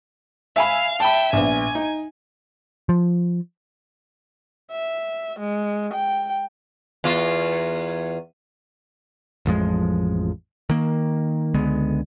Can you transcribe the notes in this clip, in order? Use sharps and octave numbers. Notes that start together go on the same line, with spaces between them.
E5 F5 G#5 B5
E5 G5 A5 B5
A#1 B3 G#5
D#4
F3
E5
G#3
G5
E2 F4
A1 F2 F3 G#3
D#3 A#3
C#2 D3 G#3 B3